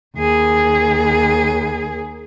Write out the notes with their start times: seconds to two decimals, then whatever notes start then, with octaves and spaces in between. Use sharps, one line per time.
0.17 D#2 G#4